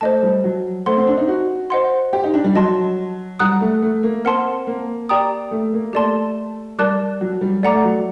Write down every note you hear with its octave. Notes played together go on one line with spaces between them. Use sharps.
A3 C5 D#5 A5
G3
F#3
A3 C5 F#5 C6
C4
D4
D#4
F#4
C5 D#5 F#5 C6
G4
D#4
D4
G3
F#3 D#5 A5 C6
G3 F#5 A#5 D#6 F#6
A3
A3
A#3
C4 A#4 F#5 A5 C6
A#3
G4 D5 G5 A#5 D#6
A3
A#3
A3 G4 D5 A5 C6
G3 A#4 D5 A5 D6 F#6
F#3
G3
A3 D5 F#5 A#5 D6
A3
F#3